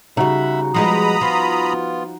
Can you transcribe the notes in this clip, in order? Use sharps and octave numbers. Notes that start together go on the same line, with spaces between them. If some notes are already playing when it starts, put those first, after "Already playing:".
C#3 G3 D#4 F#4 E5 F#5 B5
B2 F3 G3 G#3 F#5 A#5 B5 D#6
F3 B3 F4